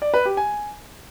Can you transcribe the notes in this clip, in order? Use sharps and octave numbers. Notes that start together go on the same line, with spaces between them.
D5
B4
G4
G#5